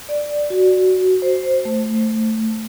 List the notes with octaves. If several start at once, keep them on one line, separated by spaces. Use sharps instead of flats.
D5
F#4
C5
A3